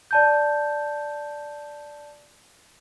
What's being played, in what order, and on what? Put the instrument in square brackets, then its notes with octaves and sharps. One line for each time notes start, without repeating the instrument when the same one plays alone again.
[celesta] D5 A5 G6